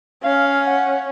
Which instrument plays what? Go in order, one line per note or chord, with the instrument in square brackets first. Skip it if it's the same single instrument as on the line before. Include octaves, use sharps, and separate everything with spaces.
[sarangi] C#4 [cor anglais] F5
[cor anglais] F#5